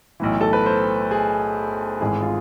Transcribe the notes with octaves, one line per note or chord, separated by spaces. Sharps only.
B1 A2 E3
A4
B4
C5
G#4
G#1 G#2 E3 G#4
F4